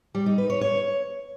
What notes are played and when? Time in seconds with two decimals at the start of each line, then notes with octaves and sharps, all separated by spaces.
0.15 G3
0.26 D#4
0.38 B4
0.50 C#5
0.61 C#5